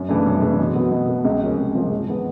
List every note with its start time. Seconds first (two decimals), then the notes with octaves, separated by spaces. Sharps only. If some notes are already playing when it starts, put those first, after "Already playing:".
Already playing: F#2
0.09 C#3 E3 A3 D4
0.26 F#2
0.42 C#3 E3 A3 D4
0.59 B2
0.76 F#3 B3
0.92 B2
1.09 F#3 B3
1.24 C#2
1.42 C3 F3 A#3 C#4
1.58 C#2
1.75 C3 F3 A#3 C#4
1.90 G#2
2.08 E3 G#3 B3